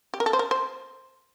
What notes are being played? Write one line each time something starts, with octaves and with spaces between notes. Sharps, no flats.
G4
A#4
A4
C5
A#4
C5